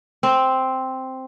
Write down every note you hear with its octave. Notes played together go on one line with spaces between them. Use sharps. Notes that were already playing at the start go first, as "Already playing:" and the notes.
C4